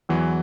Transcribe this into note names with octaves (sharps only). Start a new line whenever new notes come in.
E2 E3 F#3